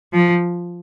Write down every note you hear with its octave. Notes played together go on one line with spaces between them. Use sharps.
F3